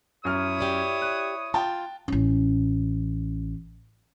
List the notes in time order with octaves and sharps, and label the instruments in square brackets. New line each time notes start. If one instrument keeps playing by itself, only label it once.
[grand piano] F#2 F6 [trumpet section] E4 C#5 D#6
[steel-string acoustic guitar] G4 D5 E5
[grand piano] F#6
[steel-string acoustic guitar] F4 [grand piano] G5 A5
[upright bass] A1 C#4